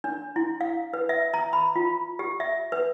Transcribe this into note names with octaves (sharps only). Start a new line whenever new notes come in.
D4
E4
F5
B4
E5
A#5
B5
F4
G4
E5
B4